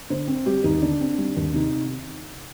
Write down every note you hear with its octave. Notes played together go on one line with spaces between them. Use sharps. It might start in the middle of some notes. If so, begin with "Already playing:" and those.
D3 C5
C4
G3 G4
D#2 D#4
D3 D4
C4
G3
D#2
C3 D#4